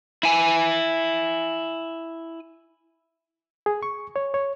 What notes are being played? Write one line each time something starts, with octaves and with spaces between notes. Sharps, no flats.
E4 G#5
G#4
C#6
C#5
C#5